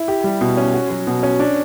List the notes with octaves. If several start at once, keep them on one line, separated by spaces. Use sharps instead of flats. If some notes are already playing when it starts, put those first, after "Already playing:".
Already playing: E4
G4
G3
B2
C#4
F#4
F#3
B2
C#4
D4